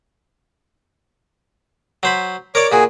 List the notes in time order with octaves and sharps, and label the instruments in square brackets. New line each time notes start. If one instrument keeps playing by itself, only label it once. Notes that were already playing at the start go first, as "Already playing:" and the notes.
[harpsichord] F#3 C5 B5
[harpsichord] A#4 D5 [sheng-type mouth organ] C#5 D6
[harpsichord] A#2 F#4 [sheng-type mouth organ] G#4